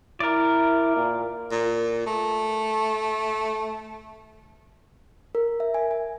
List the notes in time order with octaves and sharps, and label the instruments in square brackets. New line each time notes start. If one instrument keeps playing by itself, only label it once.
[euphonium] E4 [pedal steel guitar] A#4 D5
[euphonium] A#2
[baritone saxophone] A#2
A3
[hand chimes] A#4
E5
G#5
G#5